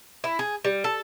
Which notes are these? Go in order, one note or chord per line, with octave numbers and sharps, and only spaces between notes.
E4
G#4
G3
A4